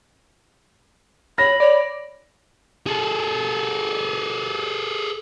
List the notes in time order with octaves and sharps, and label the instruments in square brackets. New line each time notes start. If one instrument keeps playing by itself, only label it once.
[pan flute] C#5 [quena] B5 [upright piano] A#6
[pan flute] C#5 [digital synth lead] D5
[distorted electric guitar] G#4 A4